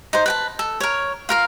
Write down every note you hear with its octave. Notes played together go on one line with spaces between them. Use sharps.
D#4 C5
B4 G5 A5
A4
A#4 C#5
F4 A#4 F5